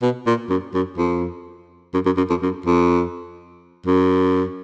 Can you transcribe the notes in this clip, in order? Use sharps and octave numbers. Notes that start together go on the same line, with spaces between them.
B2
A#2
F#2
F#2
F2
F#2
F#2
F#2
F2
F#2
F2
F#2